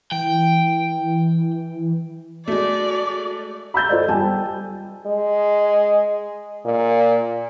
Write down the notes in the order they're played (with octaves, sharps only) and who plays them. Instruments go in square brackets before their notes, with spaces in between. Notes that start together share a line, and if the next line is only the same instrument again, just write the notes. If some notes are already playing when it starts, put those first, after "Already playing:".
[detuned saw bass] E3 [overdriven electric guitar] G5
[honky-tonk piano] G#3 A3 [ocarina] F#4 [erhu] D5
[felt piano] B5 E6 G6 A6
F4 A4 C5 D5 D#5
G3 G4 G#5 A5
[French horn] G#3
A#2